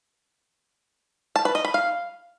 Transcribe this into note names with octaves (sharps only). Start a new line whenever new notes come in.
A5
B4
D#5
B5
F5